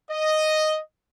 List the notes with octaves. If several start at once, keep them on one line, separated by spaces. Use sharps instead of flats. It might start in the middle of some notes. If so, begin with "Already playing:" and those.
D#5